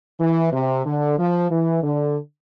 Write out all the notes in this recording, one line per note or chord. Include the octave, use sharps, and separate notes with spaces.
E3
C3
D3
F3
E3
D3